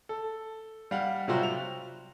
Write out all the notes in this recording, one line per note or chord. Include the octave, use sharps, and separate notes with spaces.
A4
G3 F5 F#5
C3 F#3 G3 C4 F4 F#4
F7